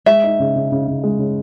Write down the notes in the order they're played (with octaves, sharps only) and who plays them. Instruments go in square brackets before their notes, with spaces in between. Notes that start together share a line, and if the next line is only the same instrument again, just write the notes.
[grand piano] G#3 [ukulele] E5
[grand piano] D#4
C#3
C#3
C#3
C#3
G#3
C#3